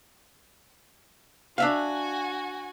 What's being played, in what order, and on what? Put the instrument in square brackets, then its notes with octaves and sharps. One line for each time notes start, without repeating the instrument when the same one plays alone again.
[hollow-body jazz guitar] D4 E5 F5 [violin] F#4 G#5